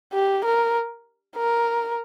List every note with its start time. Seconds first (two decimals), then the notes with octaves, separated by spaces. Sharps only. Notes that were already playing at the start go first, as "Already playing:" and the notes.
0.13 G4
0.44 A#4
1.36 A#4